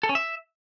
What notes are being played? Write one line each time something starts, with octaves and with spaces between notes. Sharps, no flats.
A4
C#4
E5